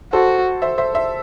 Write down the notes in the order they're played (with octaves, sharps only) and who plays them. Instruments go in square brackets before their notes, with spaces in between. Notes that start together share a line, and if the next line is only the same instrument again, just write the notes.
[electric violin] F#4 [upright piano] A4 C5
[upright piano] C5 E5
C5 E5
C5 E5